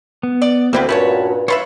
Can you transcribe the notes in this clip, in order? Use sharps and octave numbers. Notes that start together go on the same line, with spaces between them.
B3
D5
D2 G3 A#3 C4 E4 G4 B4
G2 A#2 A3 C#4 F#4 C#5 A5 B5
F4 B4 C#5 E5 B5